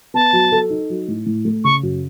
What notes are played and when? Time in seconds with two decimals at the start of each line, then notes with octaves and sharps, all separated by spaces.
0.14 B3 A5
0.33 F#3
0.52 A4
0.70 D#4
0.90 F#3
1.08 A2
1.26 A2
1.45 A3
1.64 C#3 C#6
1.83 F#2